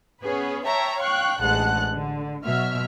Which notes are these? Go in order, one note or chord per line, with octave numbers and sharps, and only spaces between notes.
B3 C#4 G#4 B4
C#5 E5 G5 A5 A#5
F5 G5 C#6 F#6
A1 D2 G#3 F#5 A5 F#6
D3
B2 F#3 E5 F6